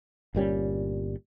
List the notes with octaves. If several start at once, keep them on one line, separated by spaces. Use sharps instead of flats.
G1 A#2 G3 C#4